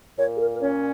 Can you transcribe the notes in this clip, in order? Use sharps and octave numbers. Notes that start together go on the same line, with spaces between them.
A#2 C#5
G#4
A#4
A#4
C#4 C#5